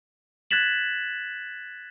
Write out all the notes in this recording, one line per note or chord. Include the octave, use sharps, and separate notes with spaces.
F#6 G#6 A6 B6 E7 F#7